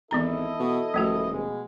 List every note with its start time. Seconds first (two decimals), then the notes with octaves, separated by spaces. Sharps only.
0.11 G#1 E3 B3 E4 A4 D#5 A#5
0.59 B2
0.94 D#1 F3 A3 F#4
1.32 B2 G#3